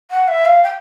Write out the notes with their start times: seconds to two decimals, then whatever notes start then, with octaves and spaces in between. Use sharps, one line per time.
0.11 F#5
0.28 E5
0.45 F5
0.63 G5